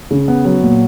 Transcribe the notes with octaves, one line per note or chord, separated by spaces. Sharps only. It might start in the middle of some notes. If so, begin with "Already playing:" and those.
C#3
B3
F#3
A#2